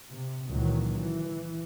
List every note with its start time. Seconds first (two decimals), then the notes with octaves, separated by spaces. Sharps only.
0.12 C3
0.50 C#2 A#2 D#3 E3 F#3
0.96 E3